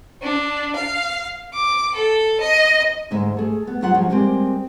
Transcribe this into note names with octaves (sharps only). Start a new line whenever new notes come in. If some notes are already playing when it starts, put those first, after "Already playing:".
D4
F5
D6
A4
D#5
D2 G#2 G#3 E5
A3 G#4
B3
F#3 F4 G#4 E5 F#5
F3 F#3 G#3 C#4
G3 G#3 A#3 C4